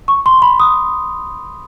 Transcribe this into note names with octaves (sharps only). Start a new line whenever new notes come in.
C#6
C6
B5
D#6